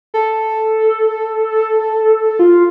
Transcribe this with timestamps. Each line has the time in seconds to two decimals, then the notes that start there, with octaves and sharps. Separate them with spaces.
0.14 A4
2.39 F4